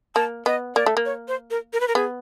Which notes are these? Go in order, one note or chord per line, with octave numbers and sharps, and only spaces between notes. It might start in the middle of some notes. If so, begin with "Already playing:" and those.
A#3 A5
B3 D#5
A#3 D5
A3
A#3
C#5
C5
A#4
A#4
B4
A#4
B3 G#4